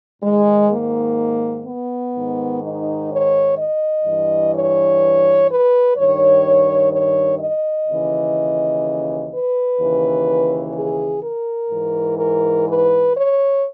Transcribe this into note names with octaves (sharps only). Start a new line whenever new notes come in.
G#2 D#3 G#3
A#3
B3
G#2 D#3
D#4
C#5
D#5
G2 E3
C#5
B4
G2 D#3 C#5
C#5
D#5
D#2 C#3 E3
B4
D#2 C#3 E3
G#4
A#4
G#2 E3
A#4
B4
C#5